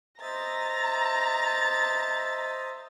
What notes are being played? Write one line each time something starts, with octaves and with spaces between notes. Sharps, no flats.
C5 D#5 E5 A#5 A6